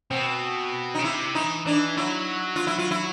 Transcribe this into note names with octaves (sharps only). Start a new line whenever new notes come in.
B2 C4
D#4
C#3
C3 E4
E3 D#4
E3 D4
F#3 E4
F4
E4
F4
E4